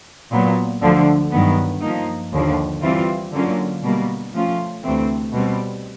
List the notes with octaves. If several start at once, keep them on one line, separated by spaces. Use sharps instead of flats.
A#2 F#3 B3
D2 D3 F3
G2 D#3 F#3 B3
F3 A#3 D#4
D#2 D3 F3
E3 G3 C4 F4
D3 F#3 A#3 C#4 F4
B2 G3 A#3
F3 A3 C#4 F4
D2 C3 E3 A3 C4
B2 G3 C4